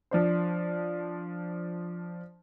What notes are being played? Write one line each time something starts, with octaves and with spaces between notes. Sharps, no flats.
F3 D4 C5